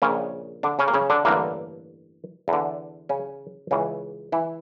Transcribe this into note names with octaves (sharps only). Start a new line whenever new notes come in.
A#1 A#2 C#3 C#4
D3 D4
C#3 C#4
A#3
C#3 C#4
D3 D4
A1 G2 D3 A#3
E2
D3
C#3 C#4
C#2 C#3 E3 C#4
E3 E4